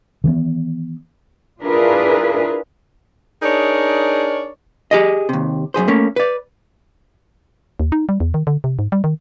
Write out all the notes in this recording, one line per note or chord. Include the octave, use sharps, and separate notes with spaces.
D#3 E3 G#3 B3
D4 E4 F4 G#4 A#4 B4
D4 D#4 G#4 A#4 C#5 D5
G4 G#4 D#5
D#2 C3
F#2 B2 G#4 C5
A3 A#3 C#4
B4 D5
D#2
D#4
G3
E2
D#3
D3
C3
G#2
G3
D#3